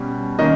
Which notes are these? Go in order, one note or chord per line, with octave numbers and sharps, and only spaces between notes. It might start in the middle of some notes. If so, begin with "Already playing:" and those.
Already playing: B2 G3 C#4
D#3 A#3 C#4 D#5